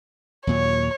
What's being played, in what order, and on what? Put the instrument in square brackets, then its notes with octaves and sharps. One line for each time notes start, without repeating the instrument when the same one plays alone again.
[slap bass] D#2 A#2 F#3 [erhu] C#5